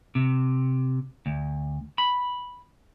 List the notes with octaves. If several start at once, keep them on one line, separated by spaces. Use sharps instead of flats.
C3
D2
B5